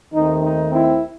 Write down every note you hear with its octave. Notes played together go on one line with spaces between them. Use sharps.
D#2 D#3 A3 C4 D#4
D#4
C4 E4